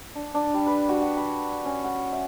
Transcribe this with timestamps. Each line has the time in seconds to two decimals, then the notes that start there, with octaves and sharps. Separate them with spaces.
0.15 D4
0.34 D4
0.54 G3
0.66 B4
0.89 F#4
1.02 F#4
1.17 B5
1.65 C#4
1.84 F#5
2.12 E5